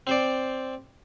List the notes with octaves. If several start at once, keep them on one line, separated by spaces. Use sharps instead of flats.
C4 C5 D5